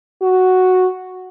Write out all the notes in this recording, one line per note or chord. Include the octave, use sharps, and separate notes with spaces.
F#4